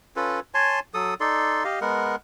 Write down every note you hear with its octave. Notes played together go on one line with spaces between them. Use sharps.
C#4 F4 A4 B4
C#5 G#5 A5 C6
F#3 A4 D#6
D#4 A4 D5 C6
G4 D#5 F5
G#3 B3 A#4 F#5